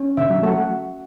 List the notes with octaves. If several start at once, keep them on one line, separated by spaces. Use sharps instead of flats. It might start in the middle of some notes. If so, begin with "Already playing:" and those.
Already playing: C#4
B2 D3 E5
D3 F#3
F#3 A3 F#4